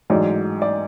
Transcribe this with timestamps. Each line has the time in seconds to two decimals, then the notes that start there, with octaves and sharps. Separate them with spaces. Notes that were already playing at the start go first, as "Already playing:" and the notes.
0.10 A1 G#2 F#3 D5
0.62 D5